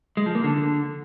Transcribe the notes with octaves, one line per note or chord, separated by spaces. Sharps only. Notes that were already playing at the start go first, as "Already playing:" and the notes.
G#3
F3
A#3
D3